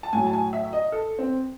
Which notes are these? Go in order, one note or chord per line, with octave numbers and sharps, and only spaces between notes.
A5
A2 F#3 G#5
A5
G#5
E5
D#5
A4
C4